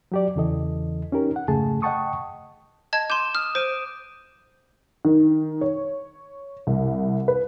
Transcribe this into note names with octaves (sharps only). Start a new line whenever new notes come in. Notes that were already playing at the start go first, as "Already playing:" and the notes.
F#3 G4 D5
E2 C#3 E3 A4 D#5
C#4 D#4 G4 A#4
F#5
F2 G#2 C#3 A3 G#4 A5
D#5 F#5 G5 A5 C#6 D#6
D#5 A5 G#6
C6 D6 G6 D#7 E7
D#6 F6 F#6
C5 G6 D7 D#7
D#3
C#5
C2
B4